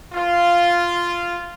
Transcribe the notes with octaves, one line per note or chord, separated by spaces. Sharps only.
F4